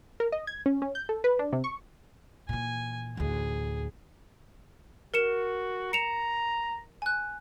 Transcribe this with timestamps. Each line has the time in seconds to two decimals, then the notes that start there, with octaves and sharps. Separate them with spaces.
0.20 A#4
0.32 D#5
0.47 G#6
0.66 C#4
0.82 C#4
0.95 G6
1.09 A4
1.24 B4
1.39 D4
1.53 C3
1.64 C#6
2.49 A#2 E3 G#5
3.17 A1 D2 G#4
5.14 F#4 A#4 C#7 E7
5.93 A#5 C#7 E7 F7
7.02 G#5 F#6